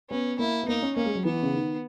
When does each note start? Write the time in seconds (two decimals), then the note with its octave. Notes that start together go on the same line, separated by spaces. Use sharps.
0.10 B3 C#4
0.39 A#3 E4
0.63 B3
0.68 A#3 D#4
0.82 C#4
0.96 A#3 C#4
1.05 G#3
1.15 F#3
1.25 E3 B3
1.43 C#3
1.53 D#3